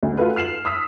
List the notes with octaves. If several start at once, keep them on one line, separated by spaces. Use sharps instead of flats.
D2
F4 F#4 A4 B4
F6 C7 E7 F#7
D#6 E6 B6